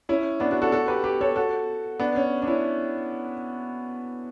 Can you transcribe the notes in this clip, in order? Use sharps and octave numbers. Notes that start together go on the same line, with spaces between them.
C#4 E4
B3 D4
D4 F#4
F#4 A4
F#4 A4
G4 B4
G4 B4
A4 C#5
F#4 A4
B3 D4
C#4
D4
C#4 E4